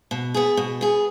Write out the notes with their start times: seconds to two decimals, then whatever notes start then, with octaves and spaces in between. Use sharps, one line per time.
0.11 B2
0.34 B3 G#4
0.57 B2
0.81 B3 G#4